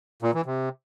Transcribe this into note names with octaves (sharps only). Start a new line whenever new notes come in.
A#2
E3
C3